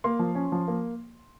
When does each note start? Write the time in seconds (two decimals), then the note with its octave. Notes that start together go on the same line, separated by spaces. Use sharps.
0.04 A#3 C6
0.19 F3
0.35 C#4
0.52 F3
0.68 A#3